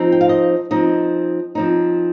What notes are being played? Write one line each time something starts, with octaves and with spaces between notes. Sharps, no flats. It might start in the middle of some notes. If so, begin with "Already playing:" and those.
Already playing: F3 C4 D#4
G5
F5
D#5
F3 C4 D#4 D#5
F3 C4 D#4